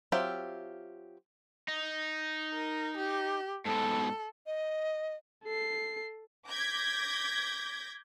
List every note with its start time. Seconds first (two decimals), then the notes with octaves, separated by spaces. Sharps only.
0.12 F#3 C4 F4 G4 E5
1.68 D#4
2.54 A#4
2.97 G4
3.66 G#2 B2 A4
4.46 D#5
5.44 A4 C7
6.49 D6 G6 G#6 A#6 B6